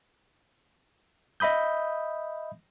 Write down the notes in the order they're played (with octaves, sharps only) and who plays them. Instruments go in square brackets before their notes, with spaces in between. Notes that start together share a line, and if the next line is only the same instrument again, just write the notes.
[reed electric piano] D#5 E5 B5 D#6 G6